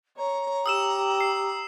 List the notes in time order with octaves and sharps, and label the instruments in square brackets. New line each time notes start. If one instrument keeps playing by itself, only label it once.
[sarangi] C#5 [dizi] A#5
[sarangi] G4 [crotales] D#6 E6 E7
[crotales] C7